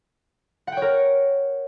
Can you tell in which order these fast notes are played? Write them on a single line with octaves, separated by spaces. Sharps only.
F#5 G5 C#5 A#4